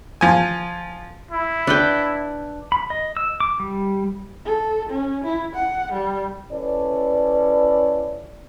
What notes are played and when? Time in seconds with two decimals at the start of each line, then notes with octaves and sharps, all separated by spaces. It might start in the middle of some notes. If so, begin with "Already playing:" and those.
0.21 F3 G#5
1.31 E4
1.67 D4 B4 G5
2.72 B5
2.90 D#5
3.17 E6
3.40 D6
3.60 G3
4.45 A4
4.89 C#4
5.24 E4
5.55 F#5
5.92 G3
6.51 C#4 E4 A4 B4 D5